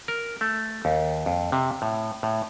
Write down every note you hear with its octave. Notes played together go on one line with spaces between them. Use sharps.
A#4
A3
D#2
F2
C3
A2
A2